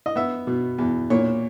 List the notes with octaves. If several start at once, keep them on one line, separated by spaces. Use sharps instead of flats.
D#5
B3 E5
B2
E2
A#2 C#5